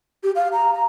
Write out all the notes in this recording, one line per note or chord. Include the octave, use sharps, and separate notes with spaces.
G4
F5
A#5
A#5